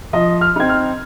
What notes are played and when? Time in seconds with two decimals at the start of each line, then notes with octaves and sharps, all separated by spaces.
0.13 F3 D#5
0.41 F6
0.56 C4 D#4 G#6
0.69 F6